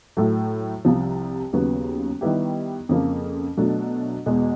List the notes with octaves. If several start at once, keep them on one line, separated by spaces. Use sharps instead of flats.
A2 F#3 A3
C2 C3 F3
D#2 C#3 F#3 B3
D#3 G3 B3 E4 G4
F2 C#3 F3 A#3
B2 F#3 A3 D4
E2 B2 G#3